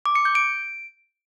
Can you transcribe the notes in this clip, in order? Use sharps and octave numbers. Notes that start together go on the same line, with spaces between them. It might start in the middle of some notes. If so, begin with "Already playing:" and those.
D6
C#7
G6
D7